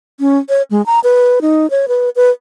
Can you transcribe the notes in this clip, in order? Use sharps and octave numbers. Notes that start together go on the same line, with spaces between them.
C#4
C#5
G#3
A#5
B4
D#4
C#5
B4
B4